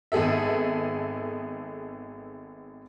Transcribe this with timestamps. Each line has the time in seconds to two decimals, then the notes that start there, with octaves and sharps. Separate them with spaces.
0.12 G#1 B3 G#4 A4 E5